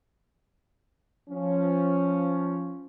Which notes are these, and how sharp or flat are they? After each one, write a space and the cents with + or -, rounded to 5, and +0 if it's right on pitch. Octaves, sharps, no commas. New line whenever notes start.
F3 +0 C#4 +0